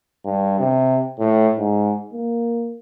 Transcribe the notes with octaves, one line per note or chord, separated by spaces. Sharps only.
G2
C3
A2
G#2
A#3